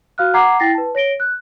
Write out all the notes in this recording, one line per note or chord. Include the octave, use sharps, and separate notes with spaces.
F#4 F5 F6 F#6
F#5 A#5 D6 G#6 C7
E4 G5 A6 A#6 C7
B4 A5
C#5 A#6 D7 G7
F#6